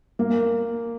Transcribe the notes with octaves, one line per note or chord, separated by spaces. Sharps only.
A#3